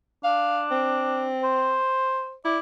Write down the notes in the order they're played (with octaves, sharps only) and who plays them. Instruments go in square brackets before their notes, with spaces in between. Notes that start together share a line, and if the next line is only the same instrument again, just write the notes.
[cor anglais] D4 [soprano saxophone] F5
[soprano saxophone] C4
[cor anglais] C5
[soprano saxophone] E4 [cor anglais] D5